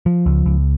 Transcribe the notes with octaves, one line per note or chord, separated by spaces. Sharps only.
F3
C#2
C#2